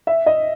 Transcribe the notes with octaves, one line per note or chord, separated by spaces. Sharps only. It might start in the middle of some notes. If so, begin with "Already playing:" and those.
E5
D#5